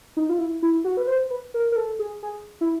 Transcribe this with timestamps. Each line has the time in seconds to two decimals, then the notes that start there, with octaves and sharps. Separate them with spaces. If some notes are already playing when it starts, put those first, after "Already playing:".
0.17 D#4
0.29 F4
0.39 E4
0.62 E4
0.84 F#4
0.97 B4
1.07 C5
1.30 B4
1.54 A#4
1.72 A#4
1.76 A4
1.99 G#4
2.23 G#4
2.61 E4